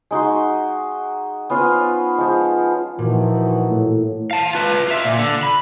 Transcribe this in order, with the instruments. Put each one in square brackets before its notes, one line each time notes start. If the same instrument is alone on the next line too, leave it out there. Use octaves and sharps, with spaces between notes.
[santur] G#3 D#4 F#4 C6
B3 C#4 F4 C5
F3 G#3
[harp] A#2 [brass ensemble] E3 D#4 F#4 [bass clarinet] F3
[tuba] A2
[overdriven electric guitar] F5 A5
F4 B4
F4 E5
A#2
D3
B5